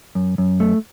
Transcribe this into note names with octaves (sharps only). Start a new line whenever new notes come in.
F#2
F#2
A3